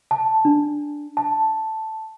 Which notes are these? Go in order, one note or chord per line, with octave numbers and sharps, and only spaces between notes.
A5
D4
A5